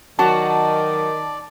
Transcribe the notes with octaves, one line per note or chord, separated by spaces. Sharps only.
D#3 F#3 F#4 D5 A5